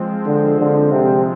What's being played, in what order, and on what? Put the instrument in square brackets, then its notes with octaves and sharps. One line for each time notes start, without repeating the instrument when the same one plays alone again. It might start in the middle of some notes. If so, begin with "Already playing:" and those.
Already playing: [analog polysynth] F3 G#3 C4
[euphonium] D3
D3
C3